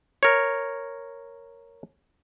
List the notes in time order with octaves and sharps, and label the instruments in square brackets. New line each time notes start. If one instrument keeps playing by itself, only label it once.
[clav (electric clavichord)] A#4 C#5